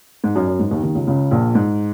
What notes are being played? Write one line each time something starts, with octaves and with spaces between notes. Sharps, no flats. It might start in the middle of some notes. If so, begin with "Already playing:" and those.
G#2
F#2
F#2
G#2
D#2 D#3
D#2 D#3
C#2 C#3
C#2 C#3
A#1 A#2
G#2